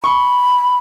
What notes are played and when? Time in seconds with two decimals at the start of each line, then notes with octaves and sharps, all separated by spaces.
0.04 B5 C#6